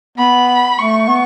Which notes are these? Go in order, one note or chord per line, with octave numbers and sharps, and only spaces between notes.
B3 B5
A3 C#6
B3